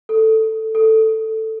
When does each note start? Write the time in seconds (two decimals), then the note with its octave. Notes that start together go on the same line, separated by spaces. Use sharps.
0.09 A4
0.75 A4